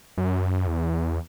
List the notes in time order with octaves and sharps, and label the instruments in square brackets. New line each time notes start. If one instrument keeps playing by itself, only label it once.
[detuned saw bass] F#2
E2